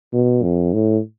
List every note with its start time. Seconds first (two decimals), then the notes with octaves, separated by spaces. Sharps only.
0.13 B2
0.43 F2
0.73 A2